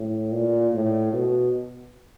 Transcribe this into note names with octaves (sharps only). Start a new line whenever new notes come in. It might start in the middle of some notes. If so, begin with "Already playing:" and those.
Already playing: A2
A#2
A2
B2